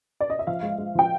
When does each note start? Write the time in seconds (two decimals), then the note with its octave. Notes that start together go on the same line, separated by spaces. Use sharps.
0.21 D5
0.30 D#5
0.39 E5
0.47 F3 F5
0.63 G#3
0.78 G#3
0.95 F3 G5